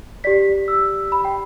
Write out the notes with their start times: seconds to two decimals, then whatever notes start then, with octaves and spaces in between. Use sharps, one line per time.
0.24 G4 D5 B6
0.68 E6
1.12 B5
1.25 G5